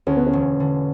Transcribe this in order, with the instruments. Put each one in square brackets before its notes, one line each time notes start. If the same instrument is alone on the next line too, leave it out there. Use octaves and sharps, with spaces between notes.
[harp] D2 [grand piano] C#4
[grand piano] B3
C#4
[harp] E1
D3